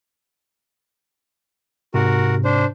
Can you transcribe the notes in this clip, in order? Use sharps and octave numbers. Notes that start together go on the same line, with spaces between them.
G#2 C3 F#4 A#4
D4 C5